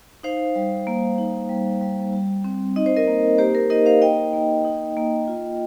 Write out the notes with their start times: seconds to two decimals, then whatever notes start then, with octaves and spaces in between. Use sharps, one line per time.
0.23 D#4 C5 F5
0.55 G3
0.87 A#3
1.18 D#4
1.49 G3
1.81 G3
2.13 G3
2.44 C4
2.76 D#4 D#5
2.86 C5
2.96 A#4 D#5
3.07 A#3
3.38 A#3 G4 C5
3.55 A#4
3.70 D#4 A#4 D#5
3.86 C5 F5
4.01 A#3 D#5 G5
4.33 A#3
4.65 D#4
4.97 A#3
5.28 F4